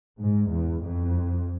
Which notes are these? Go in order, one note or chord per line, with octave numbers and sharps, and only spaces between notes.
G#2
E2
F2